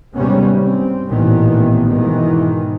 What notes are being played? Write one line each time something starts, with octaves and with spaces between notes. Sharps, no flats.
D#2 G#2 C3 G3 B3 C#4
C4
A1 A#2 D#3 E3 B3
G#2 B2 D#3 E3